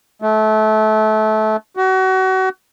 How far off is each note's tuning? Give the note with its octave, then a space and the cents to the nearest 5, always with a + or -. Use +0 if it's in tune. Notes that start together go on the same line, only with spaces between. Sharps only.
A3 -25
F#4 +30